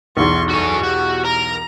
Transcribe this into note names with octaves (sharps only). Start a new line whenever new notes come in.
B1 E2 C6 C#6
F#4 A4 G#5 C#6
F#4 G4
A#4 A#5